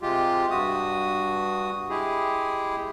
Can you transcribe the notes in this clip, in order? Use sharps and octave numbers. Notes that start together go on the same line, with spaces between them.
C3 G#3 F4 G4
G2 F#4 D#6
G#3 E4 G4 G#4